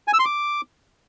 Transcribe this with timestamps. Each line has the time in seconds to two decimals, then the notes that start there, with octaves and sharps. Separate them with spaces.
0.08 G#5
0.13 E6
0.19 C6
0.25 D6